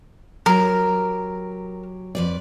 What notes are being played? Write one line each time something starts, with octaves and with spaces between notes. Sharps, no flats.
F#3 G4 A#4
F2 B4 D5